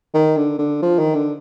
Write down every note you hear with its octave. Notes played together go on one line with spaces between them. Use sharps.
D#3
D3
D3
F3
D#3
D3